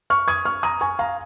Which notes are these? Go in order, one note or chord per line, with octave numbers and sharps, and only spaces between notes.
C#6 F6
D#6 G#6
C#6 F6
A#5 D#6
G#5 C#6
F5 A#5